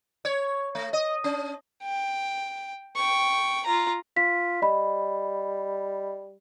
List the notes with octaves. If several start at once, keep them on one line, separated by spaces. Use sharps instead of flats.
C#5
A3
D#5
C#4
G5
G5 C#6
F4 A#5
F4 B6
G3 D#5 B5